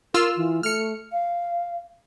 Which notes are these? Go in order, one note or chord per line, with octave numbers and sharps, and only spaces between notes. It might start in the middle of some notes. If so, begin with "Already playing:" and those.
F4 A#4 E6 F6
E3
A3 F6 C#7
F5